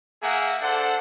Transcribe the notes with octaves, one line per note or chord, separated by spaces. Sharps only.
A#3 G#4 E5 F#5
D4 A4 C5 F#5